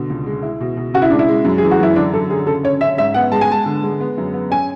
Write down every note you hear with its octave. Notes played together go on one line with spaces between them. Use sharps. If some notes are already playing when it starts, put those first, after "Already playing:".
Already playing: B2 D3
C#2
G#3
E4
B2
B2
C#3 F#4
E4
G#3 D4
E4
G#3
F#2
E3 G#4
F#4
F#2 E4
D3 D4
F#3 A4
D3 G#4
C#3 A4
C#4 C#5
C#4 E5
G#2 E5
B3 F#5
G#3 A5
G#5
G#3 A5
D3
G#3
B3
F#2
B3
C#4 G#5